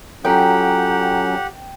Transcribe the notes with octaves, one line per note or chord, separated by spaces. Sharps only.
F#3 C#4 F4 G4 A4 F#5 G5 A#5